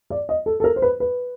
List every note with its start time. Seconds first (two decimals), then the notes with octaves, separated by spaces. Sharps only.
0.10 D5
0.29 D#5
0.46 A4
0.60 A4
0.64 A#4
0.76 C5
0.82 B4
1.00 B4